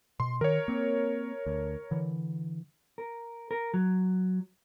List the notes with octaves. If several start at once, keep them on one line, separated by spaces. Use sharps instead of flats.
B2 C6
D#3 A#4 C#5
A#3 C4
D2
D3 E3
A#4
A#4
F#3